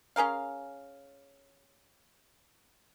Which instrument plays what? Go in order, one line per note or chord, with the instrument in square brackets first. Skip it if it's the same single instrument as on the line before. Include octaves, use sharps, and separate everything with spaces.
[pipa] C#4 G#4 A#4 F5